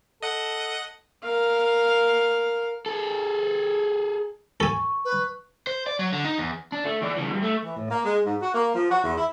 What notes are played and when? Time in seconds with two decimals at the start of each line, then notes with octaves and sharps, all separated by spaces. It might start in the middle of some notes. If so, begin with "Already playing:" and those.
0.22 A4 D#5 F#5
1.24 A#4 F5
2.86 G#4 A4
4.60 A4 G#5 C#6
5.05 B4
5.67 C5
5.87 D5
5.99 F#3
6.13 D3
6.25 D#4
6.38 E2
6.72 D4
6.85 A3
7.02 E3 D5
7.17 C#3 E3
7.30 D2 G2
7.42 A3
7.64 E3
7.77 A2
7.91 A#3
8.05 G#3
8.26 G#2
8.41 F#4
8.55 A#3
8.75 F3
8.91 F#4
9.04 E2
9.18 E4